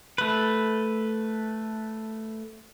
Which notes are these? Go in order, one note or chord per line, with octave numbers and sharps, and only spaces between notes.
A3 B4